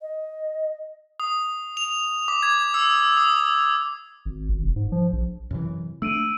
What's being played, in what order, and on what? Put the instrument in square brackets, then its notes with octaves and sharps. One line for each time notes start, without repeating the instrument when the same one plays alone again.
[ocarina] D#5
[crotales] D#6
F7
D6
G#6
E6
D#6
[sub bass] G#1
G#1
E1
G#2
F3
A#1
[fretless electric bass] F#2 C3 E3
[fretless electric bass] A3 D4 [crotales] E6 D7 D#7